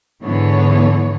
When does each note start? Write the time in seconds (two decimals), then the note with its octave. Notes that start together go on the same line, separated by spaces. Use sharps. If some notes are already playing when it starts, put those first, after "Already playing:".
0.24 G#2 D3 E3 B3 C#5